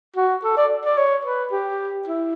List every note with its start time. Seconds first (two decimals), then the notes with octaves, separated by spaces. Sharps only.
0.16 F#4
0.44 A4
0.57 D5
0.85 D5
0.97 C#5
1.25 B4
1.52 G4
2.07 E4